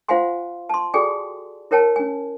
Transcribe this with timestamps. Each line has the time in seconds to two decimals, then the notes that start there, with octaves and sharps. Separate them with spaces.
0.08 F4 C5 F5 F#5 G#5 C6
0.69 A5 C6
0.94 F#4 G#4 A4 D5 G5 G#5
1.71 E4 A#4 C#5 G5 A5
1.96 C#4 G#5